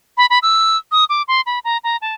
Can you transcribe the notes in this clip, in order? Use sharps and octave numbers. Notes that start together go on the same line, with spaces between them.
B5
B5
E6
D#6
D6
C6
B5
A#5
A#5
A5